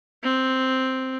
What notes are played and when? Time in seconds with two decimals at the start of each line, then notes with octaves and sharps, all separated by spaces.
0.23 C4